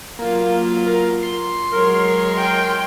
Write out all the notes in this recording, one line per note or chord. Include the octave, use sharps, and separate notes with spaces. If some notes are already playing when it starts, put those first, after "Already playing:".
F#3 A#3 F4
A#4
C6
F#3 G#3 A#4 C#5
G5